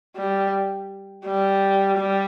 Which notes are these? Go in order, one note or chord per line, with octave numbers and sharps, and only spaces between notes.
G3
G3
G3